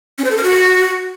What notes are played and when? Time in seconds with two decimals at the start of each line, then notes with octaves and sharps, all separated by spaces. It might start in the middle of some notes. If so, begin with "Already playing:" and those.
0.18 C#4
0.25 C5
0.31 A4
0.37 A#4
0.43 F#4